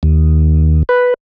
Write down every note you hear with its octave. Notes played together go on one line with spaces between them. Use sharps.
D#2
B4